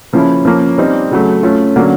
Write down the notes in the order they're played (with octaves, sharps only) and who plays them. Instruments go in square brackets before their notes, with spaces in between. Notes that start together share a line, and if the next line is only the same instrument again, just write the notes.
[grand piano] C#3 F3 A#3 C#4 E4
F3 A#3 C#4
G3 C4 D#4
C#3 F#3 A3
A3 C#4 F4
D3 F#3 A#3 C#4